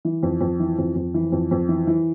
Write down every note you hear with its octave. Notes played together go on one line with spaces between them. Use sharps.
E3
F2
F2
E3
F2
F2
E3
F2
F2
E3
E3